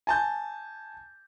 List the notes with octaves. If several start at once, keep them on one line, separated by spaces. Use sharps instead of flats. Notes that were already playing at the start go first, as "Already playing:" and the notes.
G#5 A5 G6